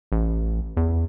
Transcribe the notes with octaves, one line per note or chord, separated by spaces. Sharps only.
A1
E2